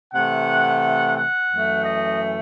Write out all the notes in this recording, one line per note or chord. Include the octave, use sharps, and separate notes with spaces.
C3 E3 A3 F#5
F#5
F#2 E3 A3
D#5